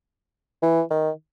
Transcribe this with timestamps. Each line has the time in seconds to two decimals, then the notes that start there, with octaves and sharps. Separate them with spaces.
0.62 E3
0.90 D#3